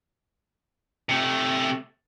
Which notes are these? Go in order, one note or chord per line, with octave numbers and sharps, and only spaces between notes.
C3 A3